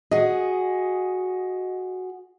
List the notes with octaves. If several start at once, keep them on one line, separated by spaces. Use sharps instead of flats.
F#4 G#4 D#5